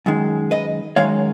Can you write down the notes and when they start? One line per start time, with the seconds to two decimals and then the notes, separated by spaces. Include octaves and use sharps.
0.06 F#2 D#3 G#3
0.51 B4 D#5
0.96 F#2 D#3 G#3 C#5 F5